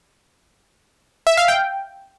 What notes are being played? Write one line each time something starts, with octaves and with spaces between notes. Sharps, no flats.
E5
F5
G5